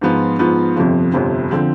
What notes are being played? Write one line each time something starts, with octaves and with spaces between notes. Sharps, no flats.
G#2 F3 B3 F4
G#2 F3 B3 F4
G1 F2 C3 F3
G1 F2 C3 F3
D3 F3 C4